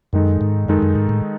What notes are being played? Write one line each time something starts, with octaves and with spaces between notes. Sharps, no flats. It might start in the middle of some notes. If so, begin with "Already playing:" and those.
F#2 D#3 G#3 D#4 A4
G#2
F#2 D#3 G#3 D#4 A4
F#2
G#2
A2